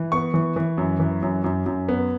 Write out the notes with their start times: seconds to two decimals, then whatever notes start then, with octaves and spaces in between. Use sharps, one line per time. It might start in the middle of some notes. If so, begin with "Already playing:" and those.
Already playing: E3
0.12 B3 C#6
0.34 E3
0.56 E3
0.78 F#2
1.00 E3
1.22 F#2
1.44 F#2
1.66 F#2
1.89 B3